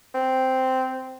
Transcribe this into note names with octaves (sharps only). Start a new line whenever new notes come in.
C4